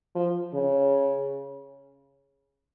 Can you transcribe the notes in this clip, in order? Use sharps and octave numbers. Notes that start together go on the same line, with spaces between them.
F3
C#3